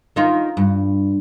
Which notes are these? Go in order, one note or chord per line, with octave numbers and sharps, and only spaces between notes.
D#3 D#4 F4
G2